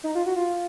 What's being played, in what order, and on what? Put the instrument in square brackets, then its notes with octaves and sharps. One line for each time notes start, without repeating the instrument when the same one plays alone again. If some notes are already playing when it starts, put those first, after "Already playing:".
[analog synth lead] D#4
F4
F#4
F4